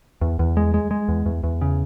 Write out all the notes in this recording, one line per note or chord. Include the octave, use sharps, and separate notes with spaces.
E2
E2
G#3
G#3
G#3
E2
E2
E2
C#3